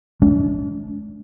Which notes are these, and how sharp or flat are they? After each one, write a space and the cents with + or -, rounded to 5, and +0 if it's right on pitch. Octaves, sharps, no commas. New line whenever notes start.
G#3 +40 D4 -45